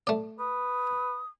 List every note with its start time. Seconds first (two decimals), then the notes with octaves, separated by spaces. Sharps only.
0.07 A3 D5
0.39 B4 D#6